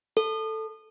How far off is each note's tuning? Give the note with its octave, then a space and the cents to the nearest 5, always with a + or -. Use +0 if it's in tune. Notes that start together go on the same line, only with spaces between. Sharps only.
A4 +5